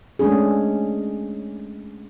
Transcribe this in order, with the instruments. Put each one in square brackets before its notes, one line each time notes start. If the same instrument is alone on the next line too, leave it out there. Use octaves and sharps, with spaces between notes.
[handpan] G#3 A3 C#4 D4 G#4